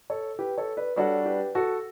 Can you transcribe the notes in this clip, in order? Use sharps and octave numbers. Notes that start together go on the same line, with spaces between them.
A4 C#5
G4 B4
A4 C#5
B4 D5
G3 D4 F#4 A4 C#5
G4 B4
F#4 A4